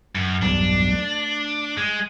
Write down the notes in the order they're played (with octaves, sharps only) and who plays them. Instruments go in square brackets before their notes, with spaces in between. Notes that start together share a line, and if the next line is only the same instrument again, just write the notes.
[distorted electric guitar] F#2
[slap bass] B1 E2 G2 [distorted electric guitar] D4
[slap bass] A3
[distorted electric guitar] G#3